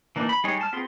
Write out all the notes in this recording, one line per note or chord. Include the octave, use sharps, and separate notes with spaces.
E3 A#3 D4 D#4
B5
G3 G#3 D#4 G#4 C#5
A5 F6
B3 C4 F4 G#4 C6